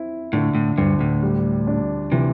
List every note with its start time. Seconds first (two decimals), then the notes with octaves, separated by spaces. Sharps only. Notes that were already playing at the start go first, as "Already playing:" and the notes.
Already playing: C4 E4
0.33 A2 D3
0.55 A2
0.78 D2 G2
1.01 A2
1.23 G3
1.67 D4
2.12 C3 E3